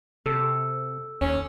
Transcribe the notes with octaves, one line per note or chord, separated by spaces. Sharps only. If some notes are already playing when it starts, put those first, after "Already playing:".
C3 A4
D#2 C#4